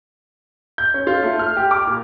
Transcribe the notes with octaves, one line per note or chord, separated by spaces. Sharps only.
G6
C#4
F4
A3
F6
G4
D6
A#2